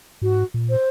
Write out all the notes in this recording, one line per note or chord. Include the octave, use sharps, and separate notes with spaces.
G#2 F#4
A#2
C5